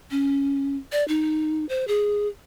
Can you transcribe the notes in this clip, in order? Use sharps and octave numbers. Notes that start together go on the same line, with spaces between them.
C#4
D5
D#4
C5
G#4